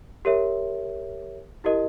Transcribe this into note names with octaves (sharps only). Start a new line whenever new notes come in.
G4 A#4 C#5 E5
E4 G4 A#4 D#5